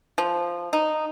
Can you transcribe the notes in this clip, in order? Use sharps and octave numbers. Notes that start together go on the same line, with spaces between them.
F3
D#4